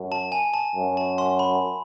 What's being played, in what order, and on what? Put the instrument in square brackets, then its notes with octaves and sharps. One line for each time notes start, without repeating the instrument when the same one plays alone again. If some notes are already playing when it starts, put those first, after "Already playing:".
Already playing: [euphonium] F#2
[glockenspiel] A5
G#5
A5
[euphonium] F#2
[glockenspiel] A5
C6
B5